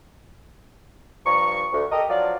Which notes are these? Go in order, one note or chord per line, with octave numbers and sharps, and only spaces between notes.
G2 F3 A#5 C#6
D2
G4 A4 A#4 D#5
F3 F#3 D4 F4 D5